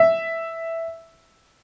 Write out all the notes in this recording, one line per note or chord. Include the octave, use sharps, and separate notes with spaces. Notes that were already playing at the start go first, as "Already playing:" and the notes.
Already playing: E5